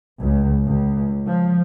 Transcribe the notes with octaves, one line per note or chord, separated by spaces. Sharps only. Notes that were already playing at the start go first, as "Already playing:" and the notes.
C#2
C#2
F3